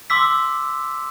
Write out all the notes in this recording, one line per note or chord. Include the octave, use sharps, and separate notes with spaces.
C6 D6 E6 B6